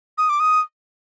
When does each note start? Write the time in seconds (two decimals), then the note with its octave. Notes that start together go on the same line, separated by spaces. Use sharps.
0.18 D#6
0.29 D6
0.40 D#6